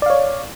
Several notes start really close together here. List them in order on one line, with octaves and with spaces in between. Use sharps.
D5 F5 C#5